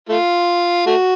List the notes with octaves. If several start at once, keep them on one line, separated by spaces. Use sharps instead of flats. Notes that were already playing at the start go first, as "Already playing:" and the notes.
A3 F4
A3 F#4